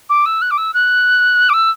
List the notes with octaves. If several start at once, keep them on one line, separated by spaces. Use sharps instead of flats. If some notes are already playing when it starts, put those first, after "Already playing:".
D6
E6
F#6
D6
E6
F#6
D6
E6